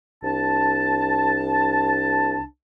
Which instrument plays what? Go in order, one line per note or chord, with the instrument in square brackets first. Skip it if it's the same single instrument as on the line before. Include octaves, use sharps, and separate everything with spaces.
[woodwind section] C2 D4 A5